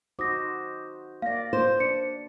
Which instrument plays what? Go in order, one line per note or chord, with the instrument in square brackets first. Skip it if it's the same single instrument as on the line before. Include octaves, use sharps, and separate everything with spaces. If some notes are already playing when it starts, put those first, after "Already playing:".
[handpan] D#4 F#4 C5 [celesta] D6 D#6 A#6
[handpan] A#3 D5 [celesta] F5 A#6
[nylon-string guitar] C5
[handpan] D4 [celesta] C#7